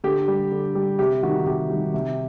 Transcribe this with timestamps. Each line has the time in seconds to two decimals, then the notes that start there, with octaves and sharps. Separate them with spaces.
0.04 D3 G4
0.28 G3
0.52 D3
0.75 G3
0.99 C3 G4
1.23 D#3 G3 F#4
1.46 C3 G4
1.70 D#3 G3
1.94 C3